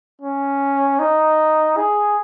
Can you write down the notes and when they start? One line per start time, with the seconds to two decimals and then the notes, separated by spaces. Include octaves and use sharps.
0.22 C#4
0.99 D#4
1.77 G#4